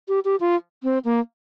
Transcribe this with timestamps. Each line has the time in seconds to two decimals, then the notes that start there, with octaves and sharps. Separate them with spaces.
0.08 G4
0.25 G4
0.40 F4
0.83 C4
1.05 A#3